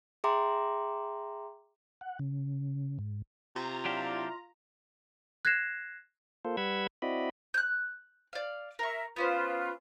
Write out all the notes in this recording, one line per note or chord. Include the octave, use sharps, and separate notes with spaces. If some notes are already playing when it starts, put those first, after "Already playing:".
G#4 E5 G5 A#5 C6 D6
F#5
C#3
G#2
C3 F4 A#5
F#3 D4 E4 G4 D5 F5
F#6 G#6 A#6 C7 E7
A#3 F4 A4 C5
G3 B4 F#5 B5 E6 G#6
C4 E4 F#4 D5 D#5 B5
F#6 G6
D5 F5
A#4 E5 C#6
B3 C#4 F4 B4 C5